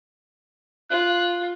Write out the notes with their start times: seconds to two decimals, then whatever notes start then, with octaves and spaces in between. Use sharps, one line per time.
0.91 F4 F#6